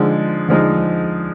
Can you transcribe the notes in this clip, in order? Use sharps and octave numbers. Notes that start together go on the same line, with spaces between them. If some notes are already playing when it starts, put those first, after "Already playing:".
Already playing: D3 F3 G#3 D#4
D3 F3 G#3 D#4